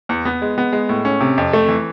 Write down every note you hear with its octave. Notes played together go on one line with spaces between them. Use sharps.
E2
B3
G#3
B3
G#3
A2
C#4
C3
F2
A3
E3